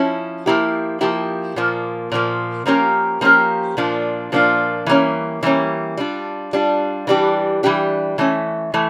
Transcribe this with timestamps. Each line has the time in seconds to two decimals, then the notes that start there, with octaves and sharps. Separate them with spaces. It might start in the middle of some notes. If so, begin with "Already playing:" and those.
Already playing: F3 C#4 E4
0.46 F3 A#3 E4 G4
1.01 F3 A#3 E4 G4
1.56 A#2 F3 A#3
2.12 A#2 F3 A#3
2.66 F3 A#3 C#4 G4 A#4
3.21 F3 A#3 C#4 G4 A#4
3.77 A#2 F3 A#3 D4 F4
4.32 A#2 F3 A#3 D4 F4
4.86 E3 G3 A#3 C#4
5.43 E3 G3 A#3 C#4
5.97 G3 D4 F4
6.53 G3 D4 F4
7.07 E3 G3 D4 G4
7.63 E3 G3 D4 G4
8.18 E3 A3 C#4
8.74 E3 A3